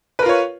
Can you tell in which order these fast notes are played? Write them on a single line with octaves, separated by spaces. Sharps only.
B4 A#4 F4 C#5